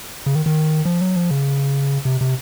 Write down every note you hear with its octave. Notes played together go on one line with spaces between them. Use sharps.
C#3
D#3
D#3
F3
F#3
F3
C#3
C3
C3